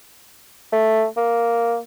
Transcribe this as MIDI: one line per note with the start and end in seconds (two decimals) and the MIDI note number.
0.73 1.06 57
1.17 1.78 58